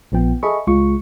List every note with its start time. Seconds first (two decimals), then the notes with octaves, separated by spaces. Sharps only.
0.12 A#1 F3 B3 G5
0.43 G#4 A4 D#5 E5 B5 C#6
0.67 C#2 G#3 F4 C#6